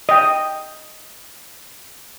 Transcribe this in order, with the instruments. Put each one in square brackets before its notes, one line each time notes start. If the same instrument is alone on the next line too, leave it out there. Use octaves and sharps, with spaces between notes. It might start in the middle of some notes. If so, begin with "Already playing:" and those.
[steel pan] D#5 G5